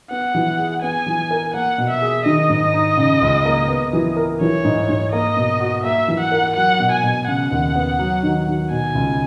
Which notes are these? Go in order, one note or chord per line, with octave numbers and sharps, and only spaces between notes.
B3 F#5
E3
G#4
B3 G#5
E3
A#4
A#3 F#5
B2
E5
G#4
D#3 D#5
G#2
D#4
C#3
C#2
A#3
B3
E3
A#4
E3 C#5
G#2
G#2
A#3 D#5
B2
F#4
A#3 E5
E3
F#5
A#4
F#3 F#5
B2
G#5
B2
C#3 F#5
D#2
B3
F#3
D#3
D#3
B2 G#5
C#2